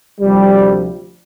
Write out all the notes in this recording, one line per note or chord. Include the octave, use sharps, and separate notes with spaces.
D2 C3 F3 G3